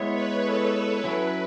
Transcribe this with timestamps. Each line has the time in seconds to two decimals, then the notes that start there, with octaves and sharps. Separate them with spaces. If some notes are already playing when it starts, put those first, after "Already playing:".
Already playing: G#3 B3 E4 C#5
0.12 B4
0.43 A4
1.04 F#3 C#4 E4 B4